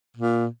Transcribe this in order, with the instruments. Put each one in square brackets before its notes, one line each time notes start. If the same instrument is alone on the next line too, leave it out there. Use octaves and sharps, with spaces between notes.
[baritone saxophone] A#2